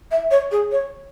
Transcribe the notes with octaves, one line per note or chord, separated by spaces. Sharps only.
E5
C#5
G#4
C#5